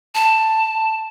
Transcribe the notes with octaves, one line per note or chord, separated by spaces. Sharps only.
A5